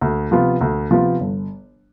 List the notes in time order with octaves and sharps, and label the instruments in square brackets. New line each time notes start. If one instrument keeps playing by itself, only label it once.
[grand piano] D2
C3 F3 B3 F4
D2
C3 F3 B3 F4
G1